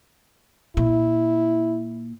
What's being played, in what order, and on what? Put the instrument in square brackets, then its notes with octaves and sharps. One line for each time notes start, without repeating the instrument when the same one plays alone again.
[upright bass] A#2 [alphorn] E4